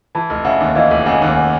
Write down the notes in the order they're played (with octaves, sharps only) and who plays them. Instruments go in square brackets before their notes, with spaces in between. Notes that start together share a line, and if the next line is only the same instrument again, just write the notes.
[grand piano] E3 [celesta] A5 B5
[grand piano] F1
[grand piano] C#3 [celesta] E5 F#5
[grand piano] D#2
[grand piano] E3 [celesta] D#5 F5
[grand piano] F1
[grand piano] C#3 [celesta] F#5 G#5
[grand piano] D#2
[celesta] F#5 G#5